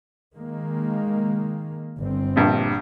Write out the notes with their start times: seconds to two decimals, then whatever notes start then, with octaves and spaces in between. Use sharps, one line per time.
0.35 D#3 G#3 A#3
2.00 G1 C4
2.36 A#1 G2